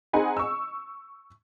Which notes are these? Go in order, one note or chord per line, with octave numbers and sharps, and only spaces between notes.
C4 D#4 G#4 F#5 G#5 B5
C#6 E6